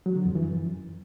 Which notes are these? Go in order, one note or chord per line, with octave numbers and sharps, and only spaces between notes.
F#3
D3
F2
E3
F#2